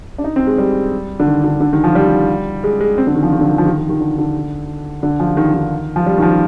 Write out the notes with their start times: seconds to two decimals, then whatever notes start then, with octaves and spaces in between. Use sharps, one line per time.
0.18 D4
0.24 D#4
0.36 C4
0.47 G#3
0.58 G3
1.20 D3
1.27 D#3
1.44 D3
1.60 D3
1.73 D#3
1.84 F3
1.95 G3
2.64 G#3
2.80 G#3
2.98 C4
3.07 D3
3.15 D#3
3.23 F3
3.32 D#3
3.41 D3
3.49 D#3
3.58 F3
3.66 D#3
3.78 D#3
3.89 D#3
4.00 D3
4.18 D3
5.03 D3
5.20 F3
5.37 D#3
5.54 D#3
5.96 F3
6.06 G3
6.18 D#3
6.22 F3